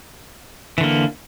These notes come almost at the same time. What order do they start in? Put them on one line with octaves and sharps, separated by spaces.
E3 D3 A#3